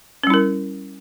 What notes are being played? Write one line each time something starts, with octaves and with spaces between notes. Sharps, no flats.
G3 C#4 E4 A#4